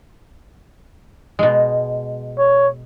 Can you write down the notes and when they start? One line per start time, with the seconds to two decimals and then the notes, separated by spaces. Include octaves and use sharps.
1.39 B2 G#3
2.38 C#5